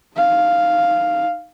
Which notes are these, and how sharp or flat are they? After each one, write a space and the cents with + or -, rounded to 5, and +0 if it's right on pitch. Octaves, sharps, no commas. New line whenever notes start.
D#4 -5 F5 +0